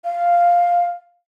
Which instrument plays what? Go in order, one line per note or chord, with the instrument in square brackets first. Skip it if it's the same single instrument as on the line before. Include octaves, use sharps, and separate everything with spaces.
[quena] F5